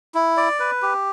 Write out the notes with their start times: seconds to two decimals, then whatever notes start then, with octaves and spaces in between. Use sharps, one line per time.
0.15 E4
0.37 D5
0.60 B4
0.82 G4